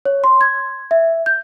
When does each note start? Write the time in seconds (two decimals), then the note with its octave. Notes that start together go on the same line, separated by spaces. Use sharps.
0.05 C#5
0.24 C6
0.41 G#6
0.91 E5
1.26 G6